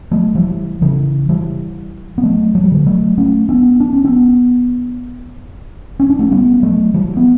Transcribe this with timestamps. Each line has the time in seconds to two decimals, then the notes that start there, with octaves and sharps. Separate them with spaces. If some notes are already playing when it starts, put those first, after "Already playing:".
0.12 F#3 A3
0.35 E3 G3
0.82 C#3 E3
1.29 E3 G3
2.18 B3
2.23 F#3 A3
2.55 F#3
2.64 G3
2.72 D3 F#3
2.86 F#3 A3
3.17 A3 C#4
3.49 B3 D4
3.80 D4
3.93 C#4
4.04 B3 D4
6.00 C#4
6.10 D4
6.19 A3 C#4
6.32 G3 B3
6.63 F#3 A3
6.94 E3 G3
7.17 B3